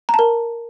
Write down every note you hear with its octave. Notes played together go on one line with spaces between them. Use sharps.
A#5
A5
A#4